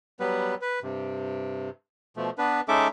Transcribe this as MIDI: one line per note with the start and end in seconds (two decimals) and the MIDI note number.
0.20 0.55 54
0.20 0.55 55
0.20 0.55 59
0.20 0.55 71
0.62 0.80 71
0.83 1.70 43
0.83 1.70 48
2.17 2.30 47
2.17 2.30 53
2.17 2.30 57
2.38 2.61 59
2.38 2.61 62
2.38 2.61 71
2.68 2.88 56
2.68 2.88 61
2.68 2.88 63
2.68 2.88 69
2.68 2.88 76
2.68 2.88 86